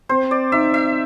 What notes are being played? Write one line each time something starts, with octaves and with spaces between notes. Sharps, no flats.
C4 C5
D5
D#4 E5
E5